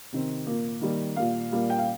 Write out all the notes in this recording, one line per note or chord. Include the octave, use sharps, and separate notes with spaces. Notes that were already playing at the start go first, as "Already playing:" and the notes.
C3 D#3 C4
A#2 A#3
D#3 G3 A#3
A#2 G3 A#3 F5
A#2 G3 A#3
G5
F5